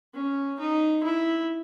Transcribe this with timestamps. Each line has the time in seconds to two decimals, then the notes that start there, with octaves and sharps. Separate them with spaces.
0.14 C#4
0.59 D#4
1.03 E4